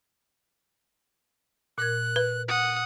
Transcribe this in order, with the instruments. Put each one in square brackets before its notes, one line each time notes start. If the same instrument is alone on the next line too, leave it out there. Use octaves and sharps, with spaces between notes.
[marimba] A#2 A#4 G#6 [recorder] F#6
[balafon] B4
[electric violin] F#5 D#6